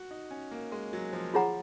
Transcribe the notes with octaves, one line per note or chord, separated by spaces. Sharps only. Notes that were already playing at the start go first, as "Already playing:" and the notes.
Already playing: F#4
D#4
C#4
A#3
G#3
F#3
F3
F3 F4 G#4 C#5 F#5 A#5